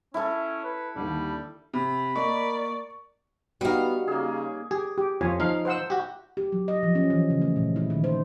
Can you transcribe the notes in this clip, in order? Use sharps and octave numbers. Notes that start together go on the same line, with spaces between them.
C#4 E4 A4
B4
D#2 D3 G3
C3 B5
A#3 A#4 D5 D#5 C#6
G3 B3 D#4 F#4 F5
C#3 A#3 G#4
G4 G#4
G4
F2 F4 C#5 G#5
F3 D#4 F5
C5 F#5 E6
F#4 G4
G4
F#3
D#5
F3
C#4
E3
C#3
A3
A#2
E4
D#3
C5